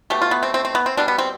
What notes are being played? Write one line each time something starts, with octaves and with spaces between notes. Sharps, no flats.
B2 A3 G4
F4
B3
C4
C4
C4
B3
C4
B2 G3 B3 D4
B3
C4